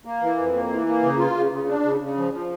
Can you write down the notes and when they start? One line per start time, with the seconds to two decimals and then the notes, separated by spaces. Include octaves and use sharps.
0.05 A#3
0.21 E3
0.38 F2
0.54 A#3
0.70 E3
0.87 A#3
1.03 C#3
1.18 F4
1.35 C#3
1.51 C#3
1.68 D4
1.84 C#3
2.00 C#3
2.17 F3
2.33 F3